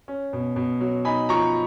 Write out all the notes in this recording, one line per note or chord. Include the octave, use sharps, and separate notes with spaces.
C#4
B2
B2
F#3
D#4 G#5 B5
F3 A#5 C#6